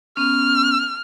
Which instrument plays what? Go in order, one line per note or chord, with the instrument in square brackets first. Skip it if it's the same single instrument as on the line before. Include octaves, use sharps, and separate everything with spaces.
[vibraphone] B3 C#4 [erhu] F6